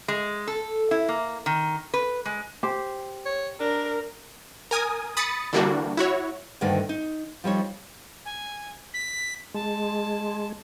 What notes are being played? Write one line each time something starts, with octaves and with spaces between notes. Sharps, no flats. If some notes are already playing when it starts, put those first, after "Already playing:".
G#3
A4
E4
A#3
D#3
B4
G#3
G4 C5
C#5
D4 A#4
A#4 G#5 D#6
B5 D#6 A6 C#7
D3 E3 G3 A#3 D4 F#4
E4 F#4 C#5
D2 G2 D3 D#3 A#3 D5
D#4
F3 G3 D#4 C#5
G#5
B6
G#3 A5